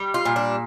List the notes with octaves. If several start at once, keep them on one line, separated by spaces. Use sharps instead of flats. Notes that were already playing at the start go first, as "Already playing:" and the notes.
Already playing: G3
F4
A#2
D4